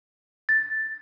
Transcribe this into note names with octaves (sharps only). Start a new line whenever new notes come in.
A6